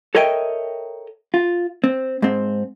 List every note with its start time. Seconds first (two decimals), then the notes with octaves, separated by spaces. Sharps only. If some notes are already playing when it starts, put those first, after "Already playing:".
0.15 A4 A#4 C#5 D#5 E5 G5
1.34 F4
1.84 C4
2.22 G#2 C4